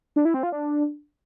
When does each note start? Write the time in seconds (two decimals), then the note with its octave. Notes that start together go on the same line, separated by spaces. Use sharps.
0.16 D4
0.25 E4
0.34 C4
0.43 F4
0.52 D4